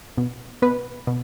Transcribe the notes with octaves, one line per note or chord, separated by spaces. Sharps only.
B2
B2 B4
B2